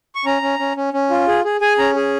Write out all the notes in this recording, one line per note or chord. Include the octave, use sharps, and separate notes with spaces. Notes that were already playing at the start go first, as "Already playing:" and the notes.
C#6
C#4 A#5
C#4
C#4
C#4
C#4
F4
G#4
G#4
G#4 G#5
C#4 A#5
G#4